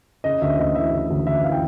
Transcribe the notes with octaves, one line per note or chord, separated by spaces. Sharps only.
C#3 D#5
D2 E5
D2 D#5
E3 E5
C#3
D2
D2 E5
E3 F5
G5